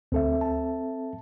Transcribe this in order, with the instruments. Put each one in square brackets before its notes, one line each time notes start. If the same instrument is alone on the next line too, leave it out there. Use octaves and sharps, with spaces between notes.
[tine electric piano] D2 [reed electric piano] C4 A4 E5
[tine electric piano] A5